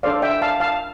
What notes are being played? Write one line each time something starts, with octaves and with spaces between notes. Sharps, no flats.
D4 A4 C5 D5 F5
E5 G5
F5 A5
F5 A5